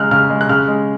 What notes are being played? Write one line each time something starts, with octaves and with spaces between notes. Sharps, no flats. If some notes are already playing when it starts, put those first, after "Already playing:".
Already playing: C#3 G#3 F6 F#6
C#3 F6
G#3
F#6
C#3 F6
G#3